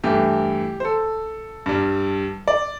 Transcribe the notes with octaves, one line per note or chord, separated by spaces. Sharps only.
G2 E3 A3 G4
C5
A4
G2 G3
D5